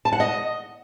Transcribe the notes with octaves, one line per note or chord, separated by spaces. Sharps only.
A5
F#5
D#5